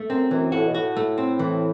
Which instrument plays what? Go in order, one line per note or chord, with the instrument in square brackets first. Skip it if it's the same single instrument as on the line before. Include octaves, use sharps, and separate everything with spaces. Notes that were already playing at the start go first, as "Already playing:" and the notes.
Already playing: [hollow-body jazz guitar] A3
[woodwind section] F#2 [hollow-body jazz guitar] C4
[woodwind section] F#2 [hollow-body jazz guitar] E3
[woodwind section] A2 [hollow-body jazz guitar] F#4
[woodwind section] B2
[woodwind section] A2 [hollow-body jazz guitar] F#4
[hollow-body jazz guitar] A3
C4
E3